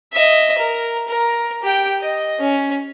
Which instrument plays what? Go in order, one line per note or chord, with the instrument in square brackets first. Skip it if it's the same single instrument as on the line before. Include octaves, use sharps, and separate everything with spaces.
[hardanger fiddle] D#5 E5
A#4
A#4
G4 G5
D#5
C#4